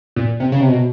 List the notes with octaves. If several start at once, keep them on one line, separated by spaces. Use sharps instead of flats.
A#2
C3
C#3
C3
B2